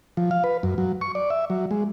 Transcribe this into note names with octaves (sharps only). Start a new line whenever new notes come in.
F3
F5
B4
F#2
F#3
C#6
D5
E5
F#3
G#3